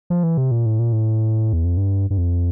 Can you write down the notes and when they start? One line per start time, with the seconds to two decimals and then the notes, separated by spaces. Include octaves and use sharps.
0.10 F3
0.23 E3
0.38 C3
0.51 A#2
0.66 A2
0.79 A#2
0.92 A2
1.53 E2
1.65 F2
1.77 G2
2.10 G2
2.18 F2